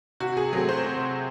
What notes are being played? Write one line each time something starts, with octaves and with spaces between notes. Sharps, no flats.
C3 F#4
G#4
F#3 A3 C4 G#4
C5
C3